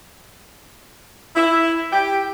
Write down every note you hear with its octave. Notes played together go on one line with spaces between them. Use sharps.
E4
G4